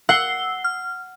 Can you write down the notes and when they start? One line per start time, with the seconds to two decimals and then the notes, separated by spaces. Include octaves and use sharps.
0.09 F#5 E6 C7 G7
0.64 F6